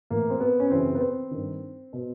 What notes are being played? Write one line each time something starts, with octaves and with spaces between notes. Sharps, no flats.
A2 E3 A#3
C4
B3
C#4
F#2 C#3 E3 C4
B3
C4
G2 D#3
B2